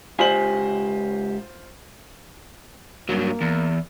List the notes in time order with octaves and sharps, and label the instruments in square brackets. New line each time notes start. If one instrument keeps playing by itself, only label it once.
[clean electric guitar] C#2 G4 G#5 [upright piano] F4 C5 F#7
[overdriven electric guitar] G2 F#3 [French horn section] A#3
[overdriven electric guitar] E2